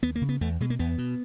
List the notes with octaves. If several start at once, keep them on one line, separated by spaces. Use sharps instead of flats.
D#2 B3
A#3
C#3
B3
E2 A3
B2 G#3
A#3
E2 B3
B2